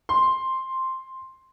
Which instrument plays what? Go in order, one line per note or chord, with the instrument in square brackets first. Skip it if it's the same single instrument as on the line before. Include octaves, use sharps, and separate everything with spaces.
[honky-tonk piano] C6